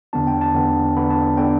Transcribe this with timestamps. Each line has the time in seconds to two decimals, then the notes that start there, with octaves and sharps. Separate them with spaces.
0.13 E2 D3 B3 D4 A5
0.27 G5
0.41 A5
0.55 E2 D3 B3 D4
0.96 E2 D3 B3 D4 B5
1.10 A5
1.37 D3 B3 D4 G5